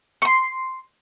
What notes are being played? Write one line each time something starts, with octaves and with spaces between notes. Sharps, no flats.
C6 C#6